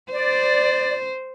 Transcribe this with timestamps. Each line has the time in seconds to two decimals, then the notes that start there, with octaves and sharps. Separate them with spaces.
0.12 C5 D5